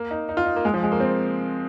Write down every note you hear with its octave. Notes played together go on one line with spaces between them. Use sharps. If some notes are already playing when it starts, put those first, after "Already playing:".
Already playing: A#3
D#4
D#4
F4
D#4
A#3
G#3
F3
G#3
A#3
C4